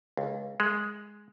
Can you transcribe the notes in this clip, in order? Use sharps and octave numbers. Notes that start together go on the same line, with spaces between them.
C#2
G#3